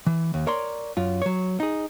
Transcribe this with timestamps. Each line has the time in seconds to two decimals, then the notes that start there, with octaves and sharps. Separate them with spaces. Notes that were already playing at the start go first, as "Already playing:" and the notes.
0.07 E3
0.34 D#2
0.47 A#4 C#5 D5 A#5 C6
0.97 F#2 F4
1.22 F#3 C#5
1.60 D#4 G#4